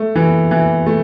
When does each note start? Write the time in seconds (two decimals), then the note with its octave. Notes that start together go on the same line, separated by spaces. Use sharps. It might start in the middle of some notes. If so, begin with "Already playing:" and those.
Already playing: A3
0.15 E3
0.51 E3
0.86 A3